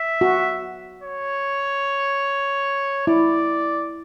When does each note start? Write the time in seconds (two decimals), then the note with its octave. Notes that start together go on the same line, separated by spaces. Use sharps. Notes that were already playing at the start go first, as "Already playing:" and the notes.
Already playing: E5
0.21 F#4
1.03 C#5
3.07 E4 D5